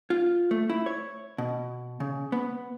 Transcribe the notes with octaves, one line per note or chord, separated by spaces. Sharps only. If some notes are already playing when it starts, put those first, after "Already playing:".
F4
A3
E4
C#5
B2
C#3
B3